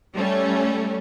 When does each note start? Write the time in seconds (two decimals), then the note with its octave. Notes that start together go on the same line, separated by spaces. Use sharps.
0.15 G3 A3 C#4